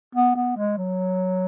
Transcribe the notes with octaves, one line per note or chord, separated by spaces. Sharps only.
B3
B3
G#3
F#3